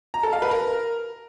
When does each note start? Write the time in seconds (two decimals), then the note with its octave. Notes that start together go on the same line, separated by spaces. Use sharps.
0.14 A#5
0.23 A4
0.33 F5
0.42 B4
0.51 A#4